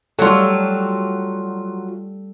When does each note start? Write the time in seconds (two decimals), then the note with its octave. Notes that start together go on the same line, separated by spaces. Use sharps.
0.19 F#3 G3 F4 A4